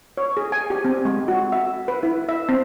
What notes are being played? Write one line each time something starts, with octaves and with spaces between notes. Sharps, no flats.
C#5
G#4
G#5
G4
C4
G#3
F#4
E5
B4
E4
E5
C4